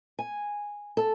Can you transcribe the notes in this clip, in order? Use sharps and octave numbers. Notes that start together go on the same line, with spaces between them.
G#5
A4